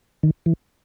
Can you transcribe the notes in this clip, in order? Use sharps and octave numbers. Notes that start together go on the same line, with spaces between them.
D#3
E3